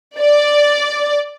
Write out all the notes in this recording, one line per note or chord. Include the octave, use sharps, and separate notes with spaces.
D5